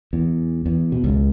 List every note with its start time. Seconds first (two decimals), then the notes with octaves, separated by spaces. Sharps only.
0.13 E2
0.66 E2
0.92 B2
1.04 C#2